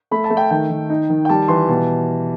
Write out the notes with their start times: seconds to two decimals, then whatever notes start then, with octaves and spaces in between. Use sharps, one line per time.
0.11 A3 B5
0.24 A5
0.30 A3
0.37 G5
0.51 D#3 G5
0.70 D#3
0.90 D#4
1.10 D#3
1.25 G5
1.29 G3 A5
1.48 E3 C6
1.69 B2 A5